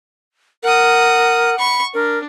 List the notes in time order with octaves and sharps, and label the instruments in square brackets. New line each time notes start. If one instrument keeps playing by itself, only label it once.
[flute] A#4 [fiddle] F#5 D#6
[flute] B5 [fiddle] C#6
[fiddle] D4 [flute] A#4